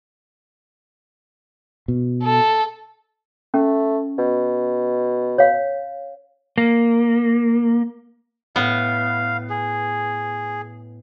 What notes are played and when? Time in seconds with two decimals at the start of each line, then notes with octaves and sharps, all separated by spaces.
1.88 B2
2.23 A4
3.54 A3 C#4
4.18 B2
5.38 C#5 F5
6.58 A#3
8.56 A2 B3 F5
9.50 G#4